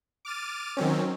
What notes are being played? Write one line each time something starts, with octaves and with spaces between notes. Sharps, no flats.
D6 F6 A6 D#7
D#3 F#3 C4 C#4